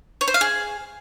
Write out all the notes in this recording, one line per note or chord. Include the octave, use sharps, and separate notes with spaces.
C#5
C5
F5
G#4